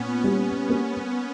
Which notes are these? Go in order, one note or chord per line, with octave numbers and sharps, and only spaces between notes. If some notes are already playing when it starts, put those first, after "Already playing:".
Already playing: A#2 B3 C#4
G3 B3 C#4
A#3